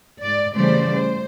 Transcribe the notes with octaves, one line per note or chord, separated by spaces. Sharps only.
G#2 D5
C#3 E3 G3 A3 C5 D5
C5